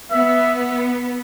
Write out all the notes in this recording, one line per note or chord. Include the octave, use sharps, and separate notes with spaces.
B3 E5